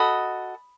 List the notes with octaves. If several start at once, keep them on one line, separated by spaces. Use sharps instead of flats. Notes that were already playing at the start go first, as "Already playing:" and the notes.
Already playing: F#4 A4 D#5 B5 D#6